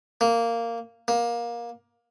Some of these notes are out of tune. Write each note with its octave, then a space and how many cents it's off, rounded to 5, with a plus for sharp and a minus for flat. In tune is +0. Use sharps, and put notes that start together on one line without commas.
A#3 -10
A#3 +20